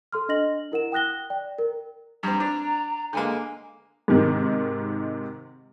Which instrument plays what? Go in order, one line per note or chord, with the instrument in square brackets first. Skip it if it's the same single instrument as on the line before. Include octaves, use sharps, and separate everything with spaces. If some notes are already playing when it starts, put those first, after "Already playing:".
[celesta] A4 C6 F6
D4 D#5 A#6 F#7
E4 A#4 F#5 E7
G5 D#6 F#6 A#6 G7
D5 G5
A#4
[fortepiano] G2 C4 [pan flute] A#5
[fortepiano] D4
[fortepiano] D3 G#3 A#3 [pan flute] G#5
[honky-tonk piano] G#2 C3 D#3